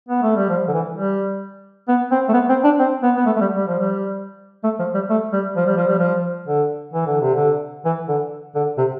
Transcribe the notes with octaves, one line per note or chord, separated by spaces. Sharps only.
B3
A3
G3
F3
D3
E3
G3
B3
C4
A3
B3
C4
D4
C4
B3
B3
A3
A3
G3
G3
F3
G3
A3
F3
G3
A3
G3
F3
G3
F3
G3
F3
D3
E3
D3
C3
D3
E3
D3
D3
C3